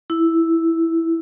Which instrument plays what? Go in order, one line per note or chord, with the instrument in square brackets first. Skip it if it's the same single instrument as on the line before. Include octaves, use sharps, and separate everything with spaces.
[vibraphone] E4